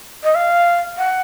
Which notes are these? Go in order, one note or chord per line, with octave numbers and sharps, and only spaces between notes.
D#5
F5
F#5